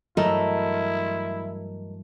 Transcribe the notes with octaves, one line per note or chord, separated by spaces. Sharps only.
G2 E3 F#3 A3 E4 A#4 D#5